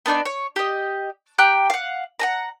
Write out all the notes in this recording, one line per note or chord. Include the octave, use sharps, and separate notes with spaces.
B3 D4 D#4 D5
C#5
G4 D#5
G4 G5 A#5 F#6
F5 F#5
F#5 G#5 A#5